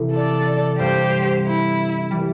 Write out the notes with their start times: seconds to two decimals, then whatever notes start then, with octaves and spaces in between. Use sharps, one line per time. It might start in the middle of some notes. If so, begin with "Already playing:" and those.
Already playing: C3 E3 A3
0.13 A4 D5
0.79 G2 G3 C4 G4 C5
1.45 E4
2.11 E3 G3